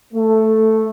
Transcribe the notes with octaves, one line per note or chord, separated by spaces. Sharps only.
A3